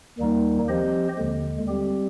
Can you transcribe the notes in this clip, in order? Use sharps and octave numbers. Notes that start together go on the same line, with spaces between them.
D#2 D#3 G3 A#3 D#4
F3 C4 G4 C5 D#5
D#2 D3 G#3
G3 C4 G4